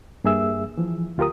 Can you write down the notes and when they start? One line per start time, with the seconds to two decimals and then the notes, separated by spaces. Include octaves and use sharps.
0.24 G2 A#3 G#4 E5 E6
0.77 E3 F3
1.18 D2 F4 G4 A#4 D#6